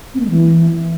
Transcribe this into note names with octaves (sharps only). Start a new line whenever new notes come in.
C4
A#3
G#3
E3